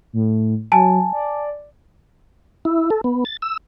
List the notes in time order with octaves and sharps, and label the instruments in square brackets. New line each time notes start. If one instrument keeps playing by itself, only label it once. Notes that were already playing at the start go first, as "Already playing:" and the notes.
[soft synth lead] A2
[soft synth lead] F#3 [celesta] G#5 A5
[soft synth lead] D5
[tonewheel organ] E4
A4
B3
A6
E6